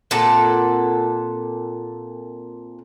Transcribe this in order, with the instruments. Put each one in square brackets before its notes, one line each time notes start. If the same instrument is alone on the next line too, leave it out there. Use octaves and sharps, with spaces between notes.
[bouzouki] A#2 C4 A4 F#5